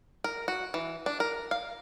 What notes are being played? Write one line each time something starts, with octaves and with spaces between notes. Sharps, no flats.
A#4
F#4
E3
D4
A#4
F5